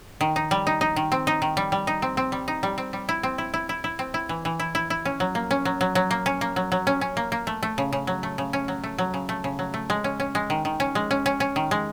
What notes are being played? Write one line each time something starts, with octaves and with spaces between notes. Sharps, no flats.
D#3
D#4
G3
D#4
D#4
D#3
C4
D#4
D#3
G3
G3
D#4
C4
C4
G3
D#4
G3
C4
G3
E4
C4
E4
E4
E4
E4
C4
E4
E3
E3
E4
E4
E4
C#4
F#3
A#3
C#4
F#3
F#3
F#3
A#3
C#4
A#3
F#3
F#3
C#4
C#4
A#3
A#3
A3
A3
C#3
C#3
F#3
A3
C#3
C#4
F#3
A3
F#3
C#3
A3
C#3
F#3
A3
G#3
C#4
C#4
G#3
D#3
D#3
C#4
G#3
C#4
C#4
C#4
D#3
G#3